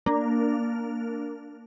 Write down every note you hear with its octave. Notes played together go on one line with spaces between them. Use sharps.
A#3 D4 A#4